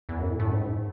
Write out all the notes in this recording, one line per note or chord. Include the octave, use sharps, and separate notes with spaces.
E2
F#2
A2
A2
F#2
G#2